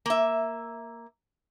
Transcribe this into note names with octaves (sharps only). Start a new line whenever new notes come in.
A#3 E5